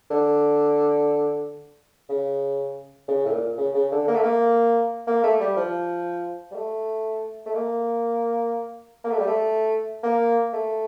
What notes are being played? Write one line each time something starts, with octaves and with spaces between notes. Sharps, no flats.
D3
C#3
C#3
A2
A#2
C#3
C#3
D3
A#3
A3
A#3
A#3
A3
G3
F3
G3
A3
A3
A#3
A#3
A3
G3
A3
A#3
A3